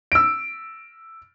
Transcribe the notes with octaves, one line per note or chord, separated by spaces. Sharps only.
E6 D7